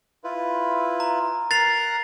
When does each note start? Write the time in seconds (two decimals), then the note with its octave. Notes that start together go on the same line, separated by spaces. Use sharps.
0.24 E4 F4 B4
1.00 A#5
1.51 A#4 A#5 F#6 A6 C7 F7